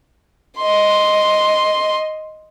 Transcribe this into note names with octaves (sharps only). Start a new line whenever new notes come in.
D#5 C6